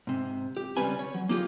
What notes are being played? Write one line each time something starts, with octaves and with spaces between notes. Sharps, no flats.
G#2 C3
G4
C#2 C3 G3 C#4 B4 G#5
C#5
F#3
A#3 D#4 F4 G4 G#4